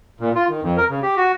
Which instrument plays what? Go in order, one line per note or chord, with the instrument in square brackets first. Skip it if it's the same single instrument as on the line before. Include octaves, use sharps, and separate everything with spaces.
[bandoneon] A#2
F4
D#3
F2
A#4
C#3
G4
F#4